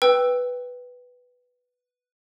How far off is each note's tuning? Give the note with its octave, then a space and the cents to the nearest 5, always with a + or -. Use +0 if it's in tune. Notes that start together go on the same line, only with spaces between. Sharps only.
B4 +0 G5 +5 E6 +0